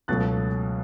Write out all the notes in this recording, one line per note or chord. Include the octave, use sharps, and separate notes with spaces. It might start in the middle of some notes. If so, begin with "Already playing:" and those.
C#2 B2 F#3 A3 F#6 A6